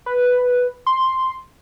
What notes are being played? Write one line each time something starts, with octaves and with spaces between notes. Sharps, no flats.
B4
C6